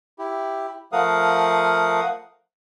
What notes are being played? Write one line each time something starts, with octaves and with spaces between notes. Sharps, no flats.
E4 G4
F3 A3 A#4 F5 F#5 D#6